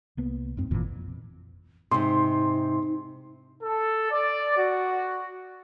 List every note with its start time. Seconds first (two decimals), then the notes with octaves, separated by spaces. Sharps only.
0.17 C2 A#3 B3
0.57 F2 G#2 C4
0.71 G#1 F2 A#2 E3
1.91 G#2 C3 D#4 C6
3.63 A4
4.11 D5
4.57 F#4